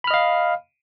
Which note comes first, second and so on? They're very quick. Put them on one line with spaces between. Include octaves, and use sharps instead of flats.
B5 F6 D#5 F5